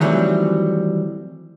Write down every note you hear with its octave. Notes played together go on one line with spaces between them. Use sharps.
D#3 E3 F#3 G3 A3 C4